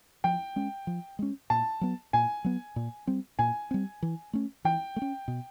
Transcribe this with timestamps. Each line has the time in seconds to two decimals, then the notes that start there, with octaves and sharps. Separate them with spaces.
0.24 F3 G5
0.56 G#3 C#4
0.87 F3
1.19 G#3 C#4
1.50 A#2 A5
1.81 F#3 B3
2.13 A#2 G#5
2.44 F#3 B3
2.76 A#2
3.07 G3 C4
3.39 A#2 G#5
3.71 G3 C4
4.02 E3
4.33 A3 C#4
4.65 E3 G5
4.96 A3
5.02 C#4
5.28 B2